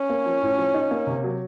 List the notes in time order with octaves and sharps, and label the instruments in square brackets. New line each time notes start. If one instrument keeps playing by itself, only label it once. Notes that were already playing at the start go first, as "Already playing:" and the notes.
Already playing: [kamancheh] C#4
[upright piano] A#3
F3
A2
F3
D#4
A#3
C3
F#3